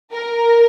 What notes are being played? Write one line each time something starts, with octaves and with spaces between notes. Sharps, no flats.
A#4